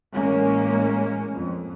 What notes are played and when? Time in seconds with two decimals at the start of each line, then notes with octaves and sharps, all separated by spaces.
0.13 A1 G#3 A#3 C#4
1.33 F2